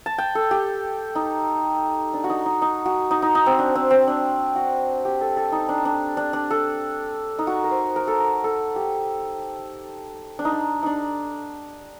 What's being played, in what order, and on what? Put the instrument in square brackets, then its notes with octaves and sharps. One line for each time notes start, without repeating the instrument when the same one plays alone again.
[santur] A5
G5
A4
G4
D#4
D4
F#4
D#4
D#4
D#4
F#4
D#4
D#4
D#4
C4
D4
C4
C4
D4
F#4
G4
A4
A4
D#4
D4
D4
D4
D4
A4
D#4
F#4
A#4
C5
A#4
A4
A#4
A4
G4
D4
D#4
D4
D4 D#4